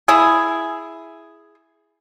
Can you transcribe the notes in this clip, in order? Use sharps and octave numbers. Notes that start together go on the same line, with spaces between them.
E4 G#4